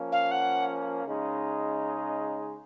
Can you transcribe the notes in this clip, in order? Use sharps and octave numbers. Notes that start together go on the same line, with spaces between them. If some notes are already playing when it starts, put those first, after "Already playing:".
Already playing: F3 A#3 C#4
F5
F#5
C#3 G#3 D#4